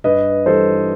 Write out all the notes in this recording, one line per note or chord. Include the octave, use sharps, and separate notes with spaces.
G2 B4 D#5
E3 G3 A4 C5